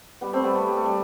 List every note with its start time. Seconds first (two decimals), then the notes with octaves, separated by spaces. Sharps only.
0.21 G3 B3
0.33 A3 C4
0.44 G3 B3
0.55 A3
0.67 G3
0.77 A3
0.86 G3